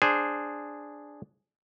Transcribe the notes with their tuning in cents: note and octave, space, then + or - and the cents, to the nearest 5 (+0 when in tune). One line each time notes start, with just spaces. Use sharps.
D4 +0 G#4 -5 C5 +0